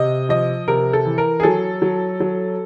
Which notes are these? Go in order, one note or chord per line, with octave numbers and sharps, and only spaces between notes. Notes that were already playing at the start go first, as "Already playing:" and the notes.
Already playing: C3 D#5
F3 D#5
C3 A#4
A4
E3
A#4
G#4
F#3 A4
F#3
F#3